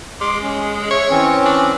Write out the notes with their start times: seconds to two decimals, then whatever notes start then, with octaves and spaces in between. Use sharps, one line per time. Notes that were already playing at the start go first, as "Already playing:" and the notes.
0.21 G#3 C6 D6
0.41 C#4
0.91 C#5 E5
1.10 E3 C4 C#4
1.46 D4